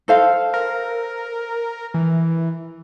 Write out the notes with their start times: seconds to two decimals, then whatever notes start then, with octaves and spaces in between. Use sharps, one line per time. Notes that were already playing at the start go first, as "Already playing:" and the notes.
0.08 A4 C5 F5
0.54 A#4
1.94 E3